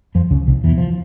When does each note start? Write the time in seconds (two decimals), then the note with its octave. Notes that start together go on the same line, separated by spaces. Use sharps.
0.15 F2 F3
0.31 C#2 C#3
0.47 C2 C3
0.64 E2 E3
0.77 F3